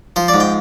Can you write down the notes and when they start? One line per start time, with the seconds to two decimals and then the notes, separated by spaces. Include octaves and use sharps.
0.16 F3 C5
0.28 D5
0.34 G#2
0.40 G5